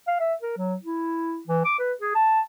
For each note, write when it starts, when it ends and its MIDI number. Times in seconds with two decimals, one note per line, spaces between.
0.08 0.18 77
0.20 0.34 76
0.42 0.54 70
0.58 0.75 54
0.83 1.41 64
1.47 1.61 52
1.65 1.76 86
1.79 1.93 71
2.01 2.12 68
2.15 2.41 81